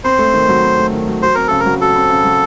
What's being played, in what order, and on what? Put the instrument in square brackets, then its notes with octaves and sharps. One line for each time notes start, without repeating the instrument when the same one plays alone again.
[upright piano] C4 [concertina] C5
[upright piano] A3
D#3
F#3
C4
A3
D#3
F#3
[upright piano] F#4 [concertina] C5
[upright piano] C4 [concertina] A#4
[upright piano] C#3 [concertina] A4
[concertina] A#4
[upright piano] F#3
[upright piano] F#4 [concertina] A4
[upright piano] C4
C#3
F#3